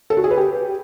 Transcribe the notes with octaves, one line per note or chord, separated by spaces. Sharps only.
A4
F#4
G#4
B4
G4